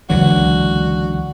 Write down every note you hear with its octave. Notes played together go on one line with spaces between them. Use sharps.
C#2 D3 E3 F#3 F#4